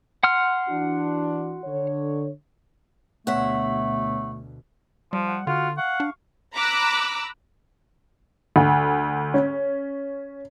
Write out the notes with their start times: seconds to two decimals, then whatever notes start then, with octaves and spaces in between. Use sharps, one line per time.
0.23 F#5 C6 F6
0.69 E3 D4 F#4
1.64 D3 C#5
3.27 D2 B2 A3 B3 C#5 E5 F#5 B6
5.13 F3 G3
5.28 F#5
5.47 D3 F4 F#4 F#5 F6
5.78 F5 F#5 C#6
6.00 D4
6.54 A#5 B5 D6 E6 F#6
8.56 D2
9.34 C#4